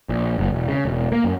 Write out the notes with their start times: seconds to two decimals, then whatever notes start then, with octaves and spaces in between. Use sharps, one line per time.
0.09 A#1
0.38 F#1
0.52 E1
0.68 C#3
0.85 E1
1.12 A#3
1.24 F#2